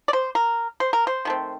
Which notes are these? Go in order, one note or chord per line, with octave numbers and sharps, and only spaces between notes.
D5
C5
A#4
C5
A#4
C5
D#3 A3 C4